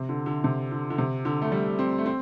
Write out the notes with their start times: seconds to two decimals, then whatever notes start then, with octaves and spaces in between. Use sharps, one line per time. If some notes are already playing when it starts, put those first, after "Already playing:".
Already playing: C3
0.09 D3
0.26 D3
0.44 C3
0.72 D3
0.90 D3
0.98 C3
1.25 D3
1.42 A3
1.52 G3
1.79 C4
1.98 A3
2.06 C4